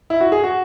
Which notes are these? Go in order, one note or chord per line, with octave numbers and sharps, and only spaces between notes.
E4
F#4
G#4
F#4